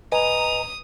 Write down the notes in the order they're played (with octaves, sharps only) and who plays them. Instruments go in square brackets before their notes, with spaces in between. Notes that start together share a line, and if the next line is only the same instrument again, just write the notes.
[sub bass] D1 [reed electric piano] B4 D#5 G#5 [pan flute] A#5 [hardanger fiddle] D#6